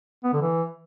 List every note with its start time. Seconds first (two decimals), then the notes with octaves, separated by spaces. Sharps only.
0.24 B3
0.33 D3
0.42 E3